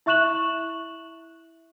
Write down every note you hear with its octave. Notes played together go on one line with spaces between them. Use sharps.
E4 E5 C#6 F#6 E7 F#7